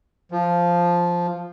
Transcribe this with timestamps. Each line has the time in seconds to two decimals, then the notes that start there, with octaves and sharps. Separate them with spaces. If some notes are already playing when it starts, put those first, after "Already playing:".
0.31 F3